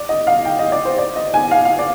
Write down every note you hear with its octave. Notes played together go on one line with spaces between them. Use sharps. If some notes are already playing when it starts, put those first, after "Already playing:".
Already playing: D5
D#5
F5
G5
D#5
D5
C5
D5
D#5
G#5
F5
F5
D5